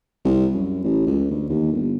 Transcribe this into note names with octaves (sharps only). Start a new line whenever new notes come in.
C2
F#2
A1
C#2
D2
D#2
G1